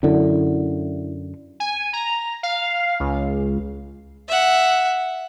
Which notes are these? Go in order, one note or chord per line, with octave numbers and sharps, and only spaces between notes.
F#2 D3 E4
G#5
A#5
F5
C#2
E5 F#5